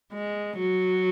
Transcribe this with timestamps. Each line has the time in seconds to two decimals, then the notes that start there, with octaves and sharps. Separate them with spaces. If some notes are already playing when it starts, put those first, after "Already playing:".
0.13 G#3
0.59 F#3